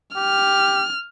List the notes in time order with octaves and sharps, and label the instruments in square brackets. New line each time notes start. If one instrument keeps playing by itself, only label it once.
[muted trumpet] G4 [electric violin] F6